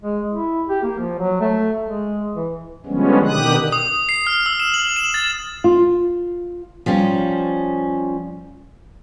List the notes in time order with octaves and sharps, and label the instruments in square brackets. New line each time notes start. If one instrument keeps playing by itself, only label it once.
[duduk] G#3
E4
G4
A#3
F3
F#3
A3
G#3
E3
[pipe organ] D3 F3 G3 G#3 B3 C#4
B2 D3 D#3 G4 D#6 F#6
[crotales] D#6
C7
F6
E6
E7
F#7
E7
A6
[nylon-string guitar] F4
[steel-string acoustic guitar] F3 G3 C#4